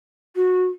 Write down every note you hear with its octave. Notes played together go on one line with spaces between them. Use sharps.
F#4